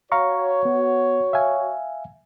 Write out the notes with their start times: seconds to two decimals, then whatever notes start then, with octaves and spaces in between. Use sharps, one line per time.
0.12 F#4 C#5 F5 A#5 C#6
0.65 B3
1.33 E5 F5 G#5